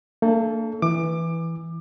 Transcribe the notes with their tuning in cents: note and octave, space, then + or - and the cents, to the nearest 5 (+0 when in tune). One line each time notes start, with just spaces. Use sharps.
A#3 -45 D4 +0 A4 -20
E3 +0 D6 +25